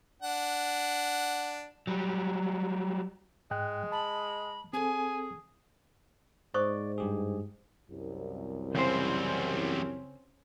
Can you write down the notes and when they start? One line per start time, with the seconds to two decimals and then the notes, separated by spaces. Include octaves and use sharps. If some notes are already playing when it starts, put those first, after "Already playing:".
0.22 D4 F#5
1.87 F#3 G3
3.51 G#2 G#3 G5 F#6
3.92 A5 B5
4.73 C4 G#4 A4 G#5
6.54 G#2 C5 D5 C#6 D#6
6.98 G2 G4 G#4
7.90 C2 F#2
8.75 E2 C#3 G3 C4 C#4 C5